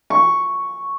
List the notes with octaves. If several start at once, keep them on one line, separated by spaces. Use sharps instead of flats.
C#6